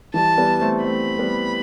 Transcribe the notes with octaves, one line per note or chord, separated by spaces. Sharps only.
E3 G3 A5
G3 B3
A3 C4
A3 C4 B5
G3 B3